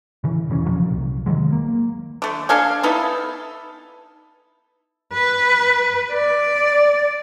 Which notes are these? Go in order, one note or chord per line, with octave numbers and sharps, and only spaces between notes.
C#3 E3
E1 C#3 E3 C#4
F2 A#2 F3 F#3
C2
D#3 E3 F#3 G#3
A#3
D3 A3
D4 A4 F5 G#5
B3 D#4 E4 A4
B4
D5